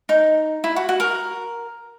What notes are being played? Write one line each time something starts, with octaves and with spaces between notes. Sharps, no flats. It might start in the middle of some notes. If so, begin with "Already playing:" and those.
D#4
E4
F#4
F#4
A#4